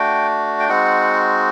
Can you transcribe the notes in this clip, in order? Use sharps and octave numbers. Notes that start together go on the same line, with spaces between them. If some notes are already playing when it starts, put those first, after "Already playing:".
Already playing: A3 D4 F#4 G5
G5
G#3 C4 D#4 F#4 F#5